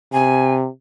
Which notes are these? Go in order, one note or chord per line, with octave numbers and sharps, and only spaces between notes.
C3 G#5